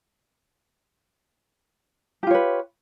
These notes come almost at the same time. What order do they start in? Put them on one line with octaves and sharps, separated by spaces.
G4 F4 C#5 B4